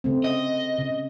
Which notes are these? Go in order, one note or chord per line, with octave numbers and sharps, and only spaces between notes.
C#3 A3 C4
D#5
C#3